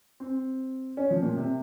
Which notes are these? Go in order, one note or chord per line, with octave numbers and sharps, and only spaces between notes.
C4
C#4
F3
A#2
C3